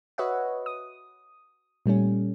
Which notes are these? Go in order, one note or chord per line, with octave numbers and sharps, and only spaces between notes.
F#4 B4 C#5 D#5 E5 F#5
D#6
A#2 G3 A3 C#4